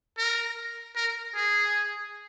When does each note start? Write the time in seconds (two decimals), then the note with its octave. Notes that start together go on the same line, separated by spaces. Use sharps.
0.18 A#4
0.96 A#4
1.35 G#4